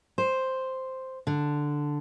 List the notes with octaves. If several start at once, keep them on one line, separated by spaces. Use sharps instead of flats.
C5
D3